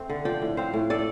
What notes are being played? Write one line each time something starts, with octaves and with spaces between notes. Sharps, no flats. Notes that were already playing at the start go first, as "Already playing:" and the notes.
Already playing: A3 C4
D3
F3 D5 G5
A2
C4 C5 F5
A2
A3 A4 D5